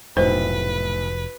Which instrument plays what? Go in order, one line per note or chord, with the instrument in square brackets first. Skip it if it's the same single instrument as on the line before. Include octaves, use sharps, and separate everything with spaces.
[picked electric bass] F1 [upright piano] B1 A2 [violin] B4 [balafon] C5